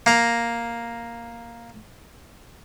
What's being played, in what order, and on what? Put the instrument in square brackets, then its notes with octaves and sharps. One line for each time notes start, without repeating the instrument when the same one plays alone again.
[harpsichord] A#3 A#5